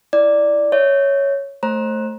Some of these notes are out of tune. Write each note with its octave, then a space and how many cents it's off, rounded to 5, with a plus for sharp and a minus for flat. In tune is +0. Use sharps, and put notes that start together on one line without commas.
E4 +0 D5 +0
C#5 +0 E5 -25
A3 +0 C5 +30 A#5 +20